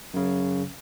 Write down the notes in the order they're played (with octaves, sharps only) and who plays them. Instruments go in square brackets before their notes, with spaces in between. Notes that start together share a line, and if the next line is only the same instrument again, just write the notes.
[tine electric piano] F#2 C#3